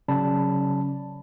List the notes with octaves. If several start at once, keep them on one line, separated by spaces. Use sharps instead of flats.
C#3 F#3 C#4 D5 A5 B5